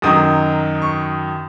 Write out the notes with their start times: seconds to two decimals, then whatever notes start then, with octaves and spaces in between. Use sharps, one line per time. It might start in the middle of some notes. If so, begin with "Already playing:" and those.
0.02 F#2 D#3 F#3 D#6
0.82 C#6